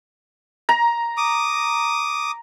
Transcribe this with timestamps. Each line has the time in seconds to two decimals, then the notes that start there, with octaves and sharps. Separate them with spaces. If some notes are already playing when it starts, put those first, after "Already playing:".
0.69 A#5
1.17 D6 D#6